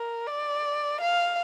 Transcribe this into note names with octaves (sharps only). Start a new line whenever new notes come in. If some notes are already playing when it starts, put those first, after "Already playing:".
Already playing: A#4
D5
F5